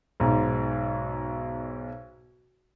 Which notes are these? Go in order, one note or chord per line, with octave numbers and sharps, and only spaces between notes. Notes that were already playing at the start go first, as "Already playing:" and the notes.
B1 G#2